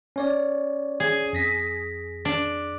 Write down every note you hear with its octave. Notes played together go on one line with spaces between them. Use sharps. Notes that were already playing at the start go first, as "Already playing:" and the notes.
C#4 C#5 D5
G#4
F2 A#6 B6
D4